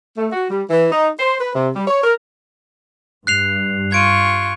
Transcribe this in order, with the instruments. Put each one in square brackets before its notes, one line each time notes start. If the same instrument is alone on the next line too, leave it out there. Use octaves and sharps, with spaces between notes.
[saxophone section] A3
F#4
G3
E3
D#4
C5
B4
C3
G3
C#5
A#4
[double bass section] G2 [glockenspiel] F#6 C7 F7
[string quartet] F4 C#6 [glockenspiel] G#6 D7 D#7